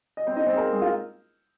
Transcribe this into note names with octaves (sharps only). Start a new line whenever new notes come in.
D#5
C4 C5
D#4 D#5
C4 C5
G#4
A#3 A#4
G#3 G#4
F4